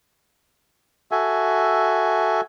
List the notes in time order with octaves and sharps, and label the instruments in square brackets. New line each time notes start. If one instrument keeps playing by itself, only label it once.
[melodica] F#4 A4 E5 G#5